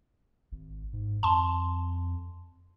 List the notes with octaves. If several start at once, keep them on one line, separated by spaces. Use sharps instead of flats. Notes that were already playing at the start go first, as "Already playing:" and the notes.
G#1
G#2
F2 A5 C6